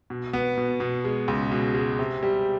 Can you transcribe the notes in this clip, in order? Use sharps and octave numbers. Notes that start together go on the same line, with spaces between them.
B2
B3
B2
B2
G#3
C#2
B2
G#3
C3
G3